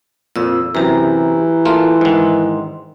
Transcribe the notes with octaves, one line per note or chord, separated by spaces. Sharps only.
F2 A#2 E6
F#2 C3 E3 G4 A#5
A3 A#3 F4 C6
G#2 D#3